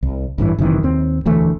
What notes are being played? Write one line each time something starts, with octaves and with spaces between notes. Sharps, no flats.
C2
A1 G2 C3 E3
F#1 C3 D#3 E3
D#2 C4
E1 D2 E3 A3